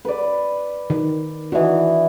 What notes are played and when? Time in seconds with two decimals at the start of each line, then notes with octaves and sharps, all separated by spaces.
0.05 B4 D5
0.90 D#3
1.52 E3 D4 F#4 D#5